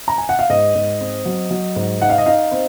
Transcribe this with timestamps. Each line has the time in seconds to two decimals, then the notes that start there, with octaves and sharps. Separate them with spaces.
0.08 A#5
0.18 G#5
0.29 F#5
0.39 F5
0.50 G#2 D#5
0.75 G#2
1.01 C4
1.26 F#3
1.51 F#3
1.76 G#2
2.01 D#4 F#5
2.10 F5
2.18 D#5
2.26 D#4 F5
2.52 C4